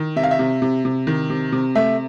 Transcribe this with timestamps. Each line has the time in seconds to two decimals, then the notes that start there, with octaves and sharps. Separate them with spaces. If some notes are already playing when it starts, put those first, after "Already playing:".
Already playing: D#3
0.16 C3 E5
0.24 F5
0.31 E5
0.39 C3
0.62 C3
0.85 C3
1.07 D#3
1.30 C3
1.52 C3
1.75 A3 E5